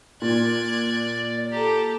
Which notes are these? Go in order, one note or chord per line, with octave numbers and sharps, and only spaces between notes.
A#2 D5 F#6 G#6
G4 A4 A#5